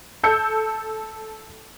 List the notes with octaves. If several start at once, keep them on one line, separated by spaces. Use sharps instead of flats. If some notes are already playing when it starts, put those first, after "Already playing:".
A4 A5 G6 C#7